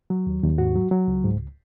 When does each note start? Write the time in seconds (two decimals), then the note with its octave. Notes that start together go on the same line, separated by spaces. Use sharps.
0.10 F#3
0.27 D#2
0.43 D#2
0.58 G#2 F#4
0.76 F#3
0.91 F#3
1.08 C#2
1.25 G#2